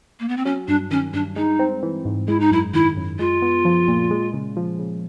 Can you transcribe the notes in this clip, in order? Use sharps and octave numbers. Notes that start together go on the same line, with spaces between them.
A#3
B3
C4
F#3 C#4
G2 D4
D#3 C#4
G2 D4
G#3 D#4
C4
E3
G#2
G#3 E4
D#4
F#2 E4
D#3 E4
F#2
G#3 F4
B3
F3
A#2
G#3
C#3
F3
C#3